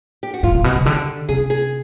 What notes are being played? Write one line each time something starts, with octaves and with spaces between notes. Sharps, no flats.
G4
F#4
G#2 F4
A#2
B2 F#4
C#3
D3 G4
C3 G#4
G#4